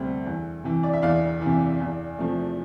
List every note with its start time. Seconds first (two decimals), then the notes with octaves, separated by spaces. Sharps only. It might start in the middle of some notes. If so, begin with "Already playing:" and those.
Already playing: D2 C3 G3 C4 E5
0.26 E2
0.64 C3 E3
0.83 D5
0.93 E5
1.02 E2 D5 F5
1.41 C3 E3
1.80 E2
2.18 C3 F3 A3